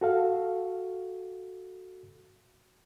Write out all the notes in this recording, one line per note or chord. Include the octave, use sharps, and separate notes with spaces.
F#4 A4 F5